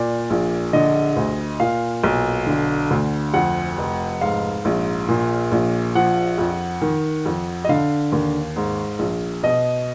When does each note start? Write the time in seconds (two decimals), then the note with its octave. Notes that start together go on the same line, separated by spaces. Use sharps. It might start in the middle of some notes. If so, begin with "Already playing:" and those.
Already playing: A#2 D5
0.30 A#1
0.73 D3 D#5
1.16 D2
1.60 A#2 F5
2.04 B1
2.47 D3
2.91 D2
3.34 F2 F#5
3.78 F1
4.21 G#2 F5
4.65 A#1
5.08 A#2
5.52 A#1
5.95 F3 F#5
6.38 F2
6.82 D#3
7.26 F2
7.65 D#5
7.69 D3 F5
8.12 D#2
8.56 G#2
8.99 A#1
9.43 B2 D#5